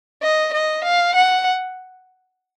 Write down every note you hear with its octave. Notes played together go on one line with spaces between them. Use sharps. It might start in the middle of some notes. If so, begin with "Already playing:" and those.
D#5
D#5
F5
F#5